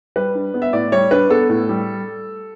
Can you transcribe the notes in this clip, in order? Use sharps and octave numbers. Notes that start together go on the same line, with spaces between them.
G3 B4
D4
B3
E5
A2 D5
G3 C#5
D4 B4
B3 A4
A2
G3